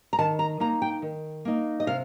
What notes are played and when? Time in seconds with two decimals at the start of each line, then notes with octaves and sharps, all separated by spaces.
0.13 A#5
0.19 D#3 A5
0.39 A#5
0.60 A#3 D#4 A#5
0.82 G5
1.02 D#3
1.45 A#3 D#4
1.80 D#5
1.87 C3 F5